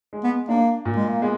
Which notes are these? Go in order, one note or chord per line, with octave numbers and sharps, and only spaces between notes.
G#3
B3
A#3 D4
A#2
G#3
A#3
G#3 B3